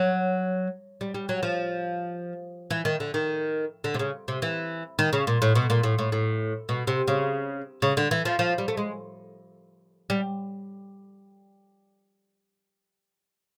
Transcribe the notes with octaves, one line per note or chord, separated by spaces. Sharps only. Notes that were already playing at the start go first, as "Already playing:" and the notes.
Already playing: F#3
G3
G3
F#3
F3
E3
D#3
D3
D#3
D3
C3
C#3
C3
E3
D#3
C#3
A#2
A2
B2
A#2
A2
A2
A2
B2
C3
C#3
C#3
D3
E3
F3
F3
G3
A3
G#3
G3